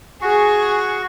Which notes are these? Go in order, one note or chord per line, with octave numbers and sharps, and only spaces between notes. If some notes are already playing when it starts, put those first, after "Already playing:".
F#4 G#4 C#6